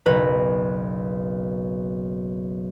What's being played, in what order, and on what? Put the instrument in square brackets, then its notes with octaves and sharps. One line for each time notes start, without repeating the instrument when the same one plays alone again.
[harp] F#1 B1 B4 A#5